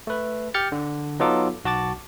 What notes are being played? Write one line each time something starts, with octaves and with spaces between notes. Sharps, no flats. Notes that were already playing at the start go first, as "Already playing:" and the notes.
A3 B4
G4 F6 G6 A6 C#7
D3
F#3 B3 D#4 F4 A4 D6
B1 F#4 A5 D6 A6